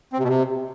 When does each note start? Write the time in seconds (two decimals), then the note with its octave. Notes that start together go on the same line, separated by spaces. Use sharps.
0.13 C4
0.18 C3
0.24 B2
0.29 C3